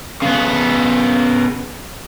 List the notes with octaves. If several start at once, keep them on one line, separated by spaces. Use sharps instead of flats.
C#3 B3